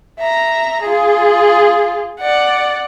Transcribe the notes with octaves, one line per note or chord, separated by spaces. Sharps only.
E5 A#5
F4 G#4
D5 F#5